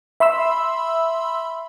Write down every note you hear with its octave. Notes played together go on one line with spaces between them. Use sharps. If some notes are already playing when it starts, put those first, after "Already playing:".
E5 B5 C6 E6